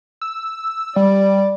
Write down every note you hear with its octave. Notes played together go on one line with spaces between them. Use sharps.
E6
G3 D5